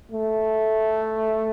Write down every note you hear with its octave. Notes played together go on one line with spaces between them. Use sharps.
A3